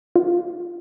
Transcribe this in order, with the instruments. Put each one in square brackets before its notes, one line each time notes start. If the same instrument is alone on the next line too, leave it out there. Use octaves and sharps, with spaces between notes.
[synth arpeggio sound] F4